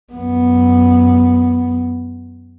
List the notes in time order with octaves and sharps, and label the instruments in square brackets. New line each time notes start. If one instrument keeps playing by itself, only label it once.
[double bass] F#2 B3